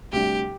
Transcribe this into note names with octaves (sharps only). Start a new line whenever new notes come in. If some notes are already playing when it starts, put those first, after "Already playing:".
D2 C3 G3 D4 G4